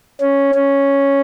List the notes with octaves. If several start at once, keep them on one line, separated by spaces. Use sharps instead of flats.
C#4
C#4